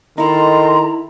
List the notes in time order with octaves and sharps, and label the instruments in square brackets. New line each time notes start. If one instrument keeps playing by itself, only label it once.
[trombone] D#3 [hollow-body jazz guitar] D#4 E4 [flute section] A4 C6 [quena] A#5